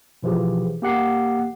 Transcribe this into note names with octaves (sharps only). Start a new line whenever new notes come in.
B2 E3 F3 G4 G#4
A#3 G4 F#5 C7